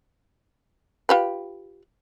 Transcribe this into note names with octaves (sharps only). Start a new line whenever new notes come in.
F4 G4 B4